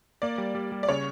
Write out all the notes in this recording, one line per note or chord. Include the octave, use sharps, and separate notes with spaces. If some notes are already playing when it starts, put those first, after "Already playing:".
A#3 D5
G3
G3
G3
D5
C#3 C#5